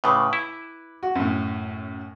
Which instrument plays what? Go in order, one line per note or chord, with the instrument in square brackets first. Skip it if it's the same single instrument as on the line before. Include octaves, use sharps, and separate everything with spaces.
[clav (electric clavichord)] A2 C#3 [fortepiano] B4 D6
[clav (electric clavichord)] E4
[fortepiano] F#4
F#2 A2